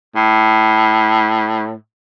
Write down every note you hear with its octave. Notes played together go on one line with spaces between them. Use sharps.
A2